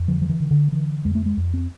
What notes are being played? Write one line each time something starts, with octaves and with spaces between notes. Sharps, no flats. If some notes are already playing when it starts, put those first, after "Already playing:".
Already playing: F2
D3 F3
F3
E3
D3
D3
D3 E3
F2 G#3
A3
G#3
F2
C4